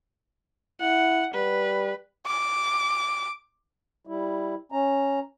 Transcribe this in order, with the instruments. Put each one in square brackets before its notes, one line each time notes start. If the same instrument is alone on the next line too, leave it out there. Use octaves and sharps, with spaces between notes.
[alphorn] E4 [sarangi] F#5
[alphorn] G3 [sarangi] B4
[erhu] D6
[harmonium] G3 E4
C#4 A#5